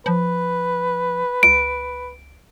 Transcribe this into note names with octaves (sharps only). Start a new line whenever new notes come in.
F3 B4
C#2 D7